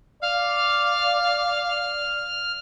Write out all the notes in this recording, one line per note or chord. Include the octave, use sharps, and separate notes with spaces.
D5 F5 F6